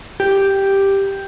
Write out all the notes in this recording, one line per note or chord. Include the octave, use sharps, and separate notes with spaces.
G4